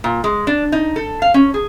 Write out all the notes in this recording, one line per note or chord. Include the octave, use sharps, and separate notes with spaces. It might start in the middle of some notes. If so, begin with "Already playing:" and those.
A#2
G#3
D4
D#4
A4
F5
C#4
G#4